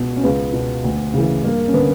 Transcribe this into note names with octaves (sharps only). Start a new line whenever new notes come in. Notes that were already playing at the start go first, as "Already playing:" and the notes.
Already playing: C#2 B2 B3
C#4
C#2 B3
B2
D2
C#3 E3
G2 A#3
C#4
D3 B3